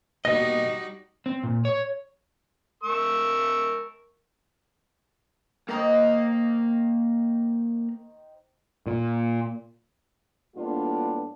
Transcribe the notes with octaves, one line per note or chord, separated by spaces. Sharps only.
B2 G3 A#3 D#4 F#4 D#5 A#6
C4
A#2
C#5
A#4 C#6 E6
D#3 A#3 D#4 A#4 C5 A#5
A#2
A2 G3 A#3 B3 D4 F4